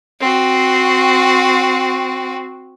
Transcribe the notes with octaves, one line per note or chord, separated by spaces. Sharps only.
C4 F#4